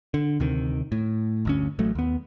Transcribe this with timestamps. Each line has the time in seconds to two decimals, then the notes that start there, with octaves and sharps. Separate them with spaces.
0.14 D3
0.40 D2 C3 D#3
0.92 A2
1.45 G1 D2 C#4
1.79 A1 F#3 A3
1.95 D#2 B3